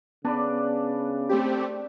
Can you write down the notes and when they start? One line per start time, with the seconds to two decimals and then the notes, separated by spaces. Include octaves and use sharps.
0.25 C#3 B3 D4 B4 D5
1.29 A3 C4 G4